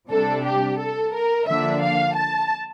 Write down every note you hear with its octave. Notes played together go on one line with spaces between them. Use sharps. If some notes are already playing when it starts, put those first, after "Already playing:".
C3 G3 D4 A4
G4
A4
A#4
D3 F3 A#3 D4 E5
F5
A5